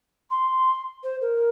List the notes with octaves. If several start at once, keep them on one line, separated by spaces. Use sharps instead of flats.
C6
C5
A#4